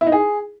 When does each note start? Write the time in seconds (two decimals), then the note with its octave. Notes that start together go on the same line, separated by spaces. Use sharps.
0.01 E4
0.07 D#4
0.12 G#4